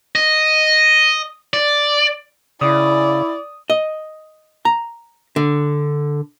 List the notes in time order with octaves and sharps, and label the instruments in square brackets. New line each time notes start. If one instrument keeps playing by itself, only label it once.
[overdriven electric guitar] D#5
D5
[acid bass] C#3 [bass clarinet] E4 [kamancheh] D5 [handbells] D#6
[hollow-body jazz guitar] D#5
A#5
D3